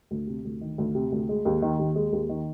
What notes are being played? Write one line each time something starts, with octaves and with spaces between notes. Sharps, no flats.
D2
C3
D2
D#3
D2
C3
D2
G#3
D#2
D#3
D#2
G#3
D#2
D#3